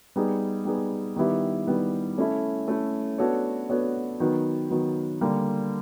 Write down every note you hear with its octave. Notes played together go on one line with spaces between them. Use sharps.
G3 B3 D#4 G#4
G3 B3 D#4 G#4
D#3 G3 B3 E4 G4
D#3 G3 B3 E4 G4
A3 C#4 E4 A4
A3 C#4 E4 A4
B3 D4 F#4 A4 C#5
B3 D4 F#4 A4 C#5
D#3 F#3 B3
D#3 F#3 B3
D3 G3 A#3